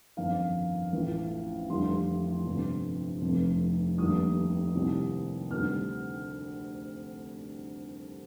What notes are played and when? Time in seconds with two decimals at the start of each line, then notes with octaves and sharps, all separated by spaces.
0.17 G1 F2 D#3 F5
0.93 A1 A2 F3
1.70 F1 F2 D3 G3 C6
2.45 G1 F2 C3 G3
3.22 F1 F2 C3
3.98 F1 D#2 D3 G3 D#6
4.75 C2 C3 D#3 G3
5.51 D2 C3 D#3 G3 F6